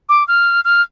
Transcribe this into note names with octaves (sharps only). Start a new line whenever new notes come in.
D6
F6
F6